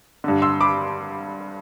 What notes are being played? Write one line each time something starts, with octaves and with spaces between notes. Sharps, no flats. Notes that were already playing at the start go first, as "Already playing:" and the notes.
G2 D3
C6 E6
B5 D6